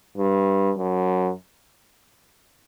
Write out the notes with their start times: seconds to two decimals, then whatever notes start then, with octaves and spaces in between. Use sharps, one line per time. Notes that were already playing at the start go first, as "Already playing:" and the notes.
0.17 G2
0.78 F#2